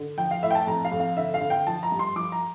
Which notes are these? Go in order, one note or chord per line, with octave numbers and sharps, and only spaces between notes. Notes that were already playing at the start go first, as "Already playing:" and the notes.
Already playing: D3
F3 G5
F5
A2 E5
G5
A5
F2 A#5
F5
F2
F5
D3 E5
F5
D3
G5
F3 A5
A#5
G2
C6
F3 D6
A#5